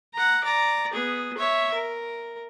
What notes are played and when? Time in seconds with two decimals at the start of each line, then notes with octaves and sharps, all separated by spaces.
0.13 F#5 A#5
0.44 D5 A#5
0.93 B3 G#4
1.37 C#5 E5
1.74 A#4